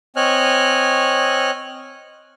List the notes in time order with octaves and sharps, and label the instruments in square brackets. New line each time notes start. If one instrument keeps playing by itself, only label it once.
[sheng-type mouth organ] C4 C#5 D#5 G#5 F6 F#6